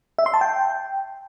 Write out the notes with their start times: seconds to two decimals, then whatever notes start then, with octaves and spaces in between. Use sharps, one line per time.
0.18 E5
0.26 C6
0.34 A5
0.41 G5